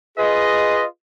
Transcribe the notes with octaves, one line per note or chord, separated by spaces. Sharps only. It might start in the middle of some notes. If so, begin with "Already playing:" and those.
F4 G#4 B4 D#5